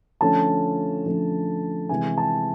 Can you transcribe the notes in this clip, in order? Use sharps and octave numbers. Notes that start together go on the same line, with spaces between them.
D3 F3 A3 C#4 A5
D3 F3 A3 C#4
C3 E3 G#3 G#5
A5